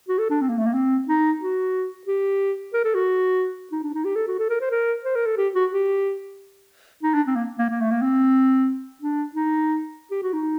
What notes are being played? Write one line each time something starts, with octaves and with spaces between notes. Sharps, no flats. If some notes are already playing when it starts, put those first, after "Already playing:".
F#4
A4
D4
C4
A#3
A3
A#3
C4
D#4
F#4
G4
A#4
A4
F#4
D#4
D4
D#4
G4
A4
F#4
A4
A#4
C5
A#4
C5
A#4
A4
G4
F#4
G4
D#4
D4
C4
A#3
A#3
A#3
A3
A#3
C4
D4
D#4
G4
F#4
D#4